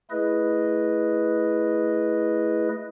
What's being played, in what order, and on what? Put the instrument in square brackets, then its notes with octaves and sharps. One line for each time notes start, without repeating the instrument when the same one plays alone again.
[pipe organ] A3 E4 G#4 B4 D#5